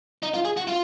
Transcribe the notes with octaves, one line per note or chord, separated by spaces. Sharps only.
D#4
F4
G#4
F#4
F4